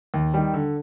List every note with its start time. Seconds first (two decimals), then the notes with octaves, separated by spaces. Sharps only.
0.14 D#2
0.34 D#3 G3
0.54 D3